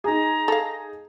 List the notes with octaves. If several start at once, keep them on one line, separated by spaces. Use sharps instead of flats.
D#4 G#4 A#5
A4 F5